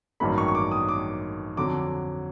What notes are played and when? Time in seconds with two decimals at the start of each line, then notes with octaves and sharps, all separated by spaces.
0.20 A1 G2 D#3 F#3 A#3 B5
0.38 C#6
0.48 C#6
0.55 D6
0.71 D#6
0.89 D6
1.57 F2 D3 F#3 D6